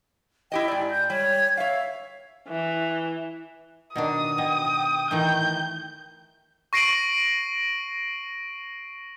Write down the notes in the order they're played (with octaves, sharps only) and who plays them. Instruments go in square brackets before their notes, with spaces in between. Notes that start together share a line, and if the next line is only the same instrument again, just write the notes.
[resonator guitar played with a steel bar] E4 G4 D#5 [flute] G5
[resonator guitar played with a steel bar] G#2 D5
[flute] G6
[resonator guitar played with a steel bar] G3 [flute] C#5
[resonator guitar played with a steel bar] C#5 F5 [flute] E5
[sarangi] E3
[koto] B2 D#3 D4 [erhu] D#6
[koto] B2 [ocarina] G5
[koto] D#3 E3 A3 [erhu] G6
[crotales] C#6 A#6 C7 D7 D#7 F#7